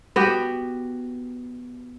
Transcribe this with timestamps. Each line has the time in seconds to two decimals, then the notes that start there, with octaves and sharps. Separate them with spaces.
0.16 B3 F#4 G4